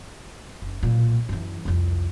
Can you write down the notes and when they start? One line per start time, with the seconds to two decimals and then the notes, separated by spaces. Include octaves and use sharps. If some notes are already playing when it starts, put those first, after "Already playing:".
0.62 F#1
0.83 B1 A#2
1.29 F#2 E3
1.65 C2 F2